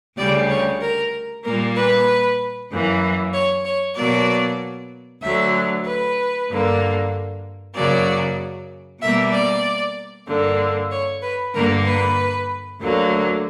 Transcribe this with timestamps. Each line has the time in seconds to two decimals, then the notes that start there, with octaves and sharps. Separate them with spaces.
0.17 D2 C#3 G3 D5
0.49 C#5
0.81 A#4
1.44 A#2 G3 A#3 A#4
1.76 B4
2.71 F#2 E3 A#3
3.34 C#5
3.65 C#5
3.96 B2 F#3 A#3 D5
5.22 D2 D3 F#3 E5
5.86 B4
6.50 G2 D3 A#3
7.75 F#2 C#3 F#3 A#3 D5
9.01 B2 G3 A#3 E5
9.33 D5
10.28 G2 D3 A#3
10.91 C#5
11.22 B4
11.53 G2 D3 A#3 A#4
11.86 B4
12.80 D2 D3 F#3 A#3